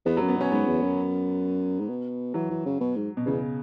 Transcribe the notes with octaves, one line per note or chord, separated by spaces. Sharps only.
E2 B3
F#3
F#2
B3
B2 C#4
G#2 B3
E2
F#2
G#2
B2
E3 F#3
E3
C#3
B2
G#2
B2
E2 C#3